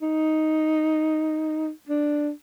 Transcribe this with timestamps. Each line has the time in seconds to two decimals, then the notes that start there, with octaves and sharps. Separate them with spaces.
0.02 D#4
1.89 D4